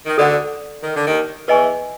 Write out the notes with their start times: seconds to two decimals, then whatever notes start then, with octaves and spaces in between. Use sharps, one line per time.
0.06 D#3
0.17 D2 D3 A4 D5 F#5
0.83 D#3
0.95 D3
1.06 D#2 D#3
1.48 E2 E3 B4 D#5 G#5 C#6